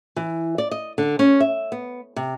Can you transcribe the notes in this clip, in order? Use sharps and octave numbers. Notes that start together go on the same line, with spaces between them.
E3
D5
D#5
D3
C#4
E5
B3
C3